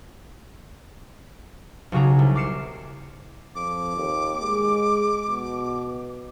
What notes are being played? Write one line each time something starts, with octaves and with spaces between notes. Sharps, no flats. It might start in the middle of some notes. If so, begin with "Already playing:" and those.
B1 C#3 F#4 G#4 A#5
C2
D6 F6 C7 C#7 E7
F2 D6
D#2
G#3
B2